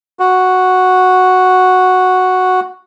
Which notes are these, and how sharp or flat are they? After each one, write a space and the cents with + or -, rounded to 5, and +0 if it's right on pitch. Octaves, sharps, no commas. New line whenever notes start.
F#4 -5